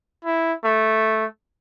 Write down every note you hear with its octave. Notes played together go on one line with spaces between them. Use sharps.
E4
A3